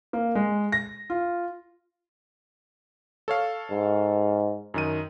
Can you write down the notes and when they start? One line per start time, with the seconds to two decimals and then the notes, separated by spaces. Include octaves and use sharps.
0.13 A#3
0.35 G#3
0.72 A#6
1.10 F4
3.28 A4 C#5 F5
3.71 G#2
4.74 F#2 D#3 D#7